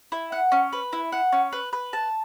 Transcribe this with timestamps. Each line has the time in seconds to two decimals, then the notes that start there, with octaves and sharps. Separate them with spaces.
0.12 E4
0.32 F#5
0.52 C#4
0.73 B4
0.93 E4
1.12 F#5
1.32 C#4
1.52 B4
1.73 B4
1.93 A5